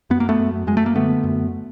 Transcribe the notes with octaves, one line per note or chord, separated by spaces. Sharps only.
F#2 B3
A#3
A3 B3
F#2
F#2 G#3
A3
A#3
D3 A3 B3
F#2